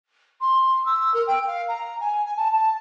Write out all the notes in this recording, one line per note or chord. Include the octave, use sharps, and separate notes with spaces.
C6
E6
A#4
G5
F5
A#5
G#5
G#5
A5
A5